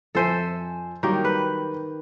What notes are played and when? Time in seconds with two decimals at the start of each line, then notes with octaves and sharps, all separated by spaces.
0.15 F2 A4 C5 E5 G#5 D#7
1.03 D#3 F#3 G3 A#3 G4
1.25 B4